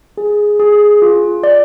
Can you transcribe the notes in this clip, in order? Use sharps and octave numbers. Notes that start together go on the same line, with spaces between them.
G#4
G#4
F4
D5